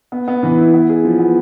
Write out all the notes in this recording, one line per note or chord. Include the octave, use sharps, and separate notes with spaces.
B3
B3
E3
E4
B3
G#4
F3
B3